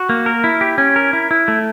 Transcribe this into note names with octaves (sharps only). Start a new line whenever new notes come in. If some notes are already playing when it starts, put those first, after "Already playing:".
Already playing: F#4
A#3
A#4
E4
G4
C#4
A#4
E4
E4
A3